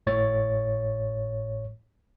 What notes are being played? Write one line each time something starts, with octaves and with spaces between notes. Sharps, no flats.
G#1 A2 C#5 A6